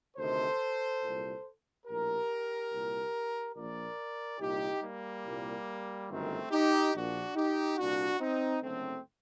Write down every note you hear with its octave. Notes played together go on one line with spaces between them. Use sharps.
D2 C3 D#3 A4 C5
C2 A#2
A#1 A2 G4 A#4
C2 A#2
A#1 A#2 A#4 D5
C2 A#2 D#4 G4
G3 A#3
C2 A#2
G1 F#2 D#3 A3 C4
D#4 G4
A#1 A#2 D4 F#4
D#4 G4
C2 A#2 D4 F#4
C4 D#4
F#1 F#2 D3 A3 C4